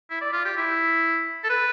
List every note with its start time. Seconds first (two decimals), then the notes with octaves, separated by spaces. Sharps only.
0.10 E4
0.21 D5
0.33 F4
0.45 G4
0.57 E4
1.44 A4
1.49 B4